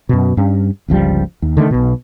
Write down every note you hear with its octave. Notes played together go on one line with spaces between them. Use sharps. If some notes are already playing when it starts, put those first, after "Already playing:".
F#2 B2
G2 C#4
G1 C#2 F3 G3
D#2
D3 D#3 A3
B1 B2